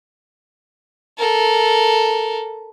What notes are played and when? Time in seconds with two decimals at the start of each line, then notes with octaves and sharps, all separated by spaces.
1.18 A4 A#4